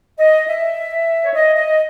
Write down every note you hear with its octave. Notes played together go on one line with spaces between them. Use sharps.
D#5
E5
C#5
D#5
D#5